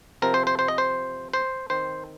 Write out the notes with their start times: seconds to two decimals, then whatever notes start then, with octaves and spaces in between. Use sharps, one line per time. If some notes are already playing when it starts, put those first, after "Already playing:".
0.22 C3 F3 C4 A#4
0.34 C5
0.47 C5
0.59 C5
0.68 D#5
0.78 C5
1.33 C5
1.70 D#3 C4 C5